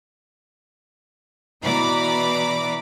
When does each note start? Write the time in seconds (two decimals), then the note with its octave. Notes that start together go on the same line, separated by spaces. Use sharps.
1.62 B2 E3 D5 A#5 B5 D6